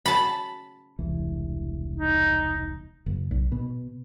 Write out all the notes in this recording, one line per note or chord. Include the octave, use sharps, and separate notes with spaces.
A5 B5
E1 C2 E3
D#4
F#1
B1
B2